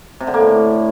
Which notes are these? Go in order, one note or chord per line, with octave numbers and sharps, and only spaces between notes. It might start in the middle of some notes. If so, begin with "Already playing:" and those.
C3
D3
A#3
A2